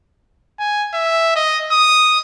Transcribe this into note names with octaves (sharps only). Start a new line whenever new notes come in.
G#5
E5
D#5
D#6